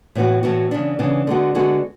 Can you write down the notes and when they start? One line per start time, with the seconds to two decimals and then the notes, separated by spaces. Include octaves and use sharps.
0.15 A2 E3 B3 F#4
0.43 A2 E3 B3 F#4
0.71 C#3 E3 B3 D4
0.99 C#3 E3 B3 D4
1.27 D3 G#3 B3 F#4
1.55 D3 G#3 B3 F#4